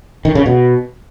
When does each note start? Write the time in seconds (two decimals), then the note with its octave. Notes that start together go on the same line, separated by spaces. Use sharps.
0.25 D#3
0.35 C#3
0.46 B2